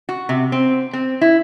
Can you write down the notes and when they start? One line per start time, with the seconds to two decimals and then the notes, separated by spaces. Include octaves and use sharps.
0.09 F#4
0.29 C3
0.52 C4
0.93 C4
1.21 E4